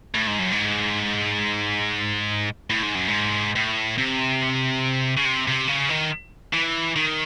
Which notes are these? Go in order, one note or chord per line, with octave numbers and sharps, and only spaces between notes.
A2
G#2
F#2
G#2
A2
G#2
F#2
G#2
A2
C3
C#3
C3
C3
C#3
D#3
E3
D#3